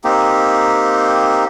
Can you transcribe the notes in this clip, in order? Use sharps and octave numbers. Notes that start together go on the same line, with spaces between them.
A#3 C4 D#4 G4